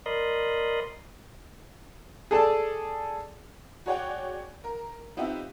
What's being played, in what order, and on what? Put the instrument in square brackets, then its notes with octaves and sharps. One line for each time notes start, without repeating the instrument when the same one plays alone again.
[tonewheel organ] A#4 D5 D#5 B5 C6 D#6
[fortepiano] G#4 A4 D5 A5
[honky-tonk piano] F#4 G#4 C#5 D5 F#5 G5
A#4
B3 C4 D#4 F4 G4 E5